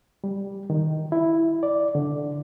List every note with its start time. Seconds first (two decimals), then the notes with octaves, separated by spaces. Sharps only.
0.24 G3
0.70 D#3
1.12 E4
1.63 D5
1.95 D3